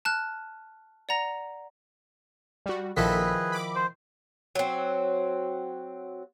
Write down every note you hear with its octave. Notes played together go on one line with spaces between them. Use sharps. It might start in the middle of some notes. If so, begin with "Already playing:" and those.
A5 F6 F#6
D5 F#5 A#5 A#6 F7
G3 F#4
A#1 D#3 F3 E4 G#4 A4 B4 B6
B5 D6
C5
F#3 C4